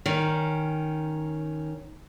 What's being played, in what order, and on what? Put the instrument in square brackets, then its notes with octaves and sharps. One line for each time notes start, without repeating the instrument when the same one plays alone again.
[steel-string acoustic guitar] D#3 C#4